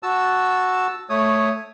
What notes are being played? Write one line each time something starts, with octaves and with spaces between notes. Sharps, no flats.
F#4 A5 E6
A3 C#5 D#6